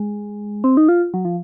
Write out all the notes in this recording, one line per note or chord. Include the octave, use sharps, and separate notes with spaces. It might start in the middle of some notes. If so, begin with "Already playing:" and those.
Already playing: G#3
C4
D#4
F4
F#3
F3